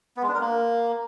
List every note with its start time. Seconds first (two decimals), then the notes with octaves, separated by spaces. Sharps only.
0.17 B3
0.23 G#3
0.29 D4
0.35 A#4
0.40 A#3